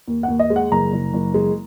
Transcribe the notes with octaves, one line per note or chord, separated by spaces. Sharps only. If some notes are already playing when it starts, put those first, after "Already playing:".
D#2
F#5
D#2
D#5
G#3
F#5
F#1 A#5
F#1
F#1
G#3